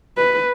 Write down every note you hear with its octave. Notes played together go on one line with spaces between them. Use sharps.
B4